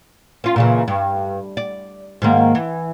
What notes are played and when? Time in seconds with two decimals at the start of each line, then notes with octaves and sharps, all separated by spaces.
0.44 C#4 F4
0.56 A#2 C#3 E3
0.88 G2
1.57 D5
2.22 G#2 D#3 A#3
2.55 E3